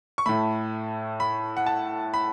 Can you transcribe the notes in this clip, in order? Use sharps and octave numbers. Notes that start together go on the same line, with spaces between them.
C#6
A2 A3 B5
B5
F#5
A5
B5